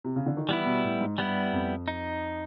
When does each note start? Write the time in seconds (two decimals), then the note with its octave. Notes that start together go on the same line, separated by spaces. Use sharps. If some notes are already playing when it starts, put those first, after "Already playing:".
0.04 C3
0.16 C#3
0.26 D3
0.37 D#3
0.49 E3 G3 B3 E4
0.66 B2
0.84 A2
1.01 G#2
1.18 G2 G3 B3 E4
1.53 F2
1.88 D#4